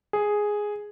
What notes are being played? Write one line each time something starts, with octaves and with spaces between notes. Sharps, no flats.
G#4